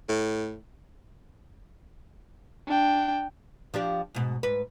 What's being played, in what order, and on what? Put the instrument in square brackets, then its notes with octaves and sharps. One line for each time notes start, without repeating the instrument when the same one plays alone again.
[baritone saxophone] A2
[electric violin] D4 G5
[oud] F3 D4 G4
G#2 B2
G#2 B4